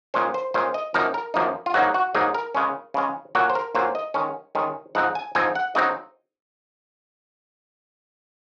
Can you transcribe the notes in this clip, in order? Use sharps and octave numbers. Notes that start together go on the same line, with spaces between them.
A#2 G#3 C#4 C5
C5
A#2 G#3 C#4 C5
D#5
F#2 F3 A#3 D#4 A#4
A#4
F#2 F3 A#3 D#4
F4
G#2 F#3 A#3 D#4 F#4
F#4
G#2 F#3 A#3 D#4 G#4
A#4
C#3 G#3 C#4
C#3 G#3 C#4
A#2 F#3 A#3 F#4
C5
A#4
A#2 F#3 A#3 C5
D#5
D#3 G#3 C#4
D#3 G#3 C#4
G#2 F3 C4 D#4 F#5
G#5
G#2 F3 C4 D#4 G#5
F#5
C#3 F#3 C4 D#4 D#5